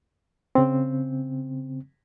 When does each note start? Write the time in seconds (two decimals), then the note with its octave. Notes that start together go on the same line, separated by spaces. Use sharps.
0.55 C#3 C4